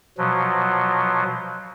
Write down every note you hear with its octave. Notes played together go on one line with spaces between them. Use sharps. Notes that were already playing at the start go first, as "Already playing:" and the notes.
B2 F3 F#3